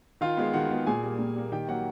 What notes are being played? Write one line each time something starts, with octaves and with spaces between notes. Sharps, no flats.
D#3 F4 F5
G#3 B3
D#3 F#4 F#5
G#3 B3
A#2 G#4 G#5
G3 A#3
A#2
G3 A#3
D#3 G4 G5
F#3 A#3 F#4 F#5